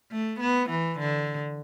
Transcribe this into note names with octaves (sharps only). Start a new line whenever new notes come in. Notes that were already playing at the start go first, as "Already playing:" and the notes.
A3
B3
E3
D3